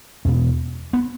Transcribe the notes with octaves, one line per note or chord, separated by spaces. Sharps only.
E2 B2 C#4
B3